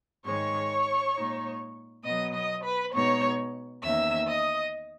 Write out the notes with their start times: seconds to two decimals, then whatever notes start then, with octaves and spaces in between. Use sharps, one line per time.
0.25 G#2 D#3 G#3 C#5 C#6
1.15 A#2 G#3 D#4
2.04 B2 F#3 B3 D#5 D#6
2.33 D#5 D#6
2.64 B4 B5
2.93 B2 G#3 B3 D#4 C#5 C#6
3.83 E2 D#3 A#3 C#4 E5 E6
4.27 D#5 D#6